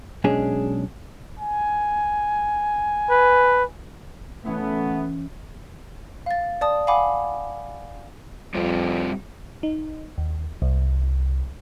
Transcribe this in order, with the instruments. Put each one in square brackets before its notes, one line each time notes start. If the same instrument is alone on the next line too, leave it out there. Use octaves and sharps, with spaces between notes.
[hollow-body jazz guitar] B1 G#3 C#4 D4 G#4
[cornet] G#5
[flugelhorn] B4
[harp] E3 C#4 E4 [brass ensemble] A3 B3
[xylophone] F5 A6
D5 A5 D#6
F5 F#5 G#5 B5 D6
[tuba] F2 [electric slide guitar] G3 C4 F4
[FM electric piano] D#4
D#2
C2